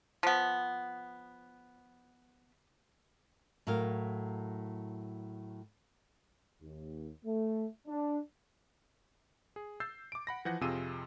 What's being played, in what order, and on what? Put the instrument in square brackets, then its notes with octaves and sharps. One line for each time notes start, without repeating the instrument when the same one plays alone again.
[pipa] F3 B3
[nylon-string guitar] A2 F#3 A#4 F5
[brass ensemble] D#2
A3
D4
[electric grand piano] G#4
E6 G6 A6 C7
D6 D7
F#5 B5 A#6
E3 F3 F#5 G6 A#6
F2 C3 F4 G#4 E6 D#7